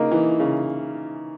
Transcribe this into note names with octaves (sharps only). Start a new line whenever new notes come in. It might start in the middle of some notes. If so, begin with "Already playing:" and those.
Already playing: C#3 A#3 D#4
E3
C#3